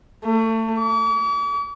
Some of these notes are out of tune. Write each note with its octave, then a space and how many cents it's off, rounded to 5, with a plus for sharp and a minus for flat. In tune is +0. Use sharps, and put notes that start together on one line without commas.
A3 +30
D6 -45